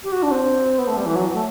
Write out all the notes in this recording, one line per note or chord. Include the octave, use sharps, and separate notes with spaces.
G4
F#4
D4
C4
B3
A3
G3
E3
F#3
A3